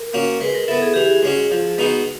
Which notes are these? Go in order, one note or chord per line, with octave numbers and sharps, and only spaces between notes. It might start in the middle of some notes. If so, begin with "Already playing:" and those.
Already playing: A#4
A#3 C#4 F#4
G#3 B4
A#4
B3 E4 A4
G#4
E3 G4
G#4
G#3 C#4 F#4
F3
G#3 B3 D#4 F#4